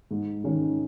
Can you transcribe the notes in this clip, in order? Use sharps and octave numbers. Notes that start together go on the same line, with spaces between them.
G#2
D#3 G#3 C#4